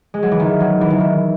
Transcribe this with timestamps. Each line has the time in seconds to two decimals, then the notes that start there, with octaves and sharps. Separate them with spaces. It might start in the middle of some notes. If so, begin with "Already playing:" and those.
0.14 G#3
0.23 F#3
0.31 E3
0.40 D#3
0.60 F#3
0.81 E3
0.90 D#3
1.00 E3